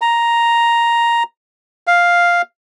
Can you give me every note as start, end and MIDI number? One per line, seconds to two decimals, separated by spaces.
0.02 1.23 82
1.87 2.42 77